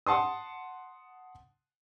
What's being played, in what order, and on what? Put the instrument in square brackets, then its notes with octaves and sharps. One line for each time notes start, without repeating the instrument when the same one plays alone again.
[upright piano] F#5 A5 C6 D#6